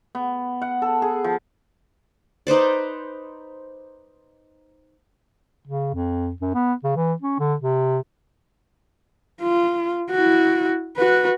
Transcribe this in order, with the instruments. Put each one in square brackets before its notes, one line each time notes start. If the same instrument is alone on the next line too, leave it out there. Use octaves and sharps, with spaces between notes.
[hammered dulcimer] B3
F#5
A4
G#4
F3
[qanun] D#4 B4 C5 D5
[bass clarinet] C#3
F2
F#2
B3
C#3
E3
C#4
D3
C3
[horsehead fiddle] F4
E4 F#4
F#4 B4